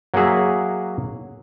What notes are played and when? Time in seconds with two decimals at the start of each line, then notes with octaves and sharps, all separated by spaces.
0.14 F#3 A#3 F#4 G#4 E5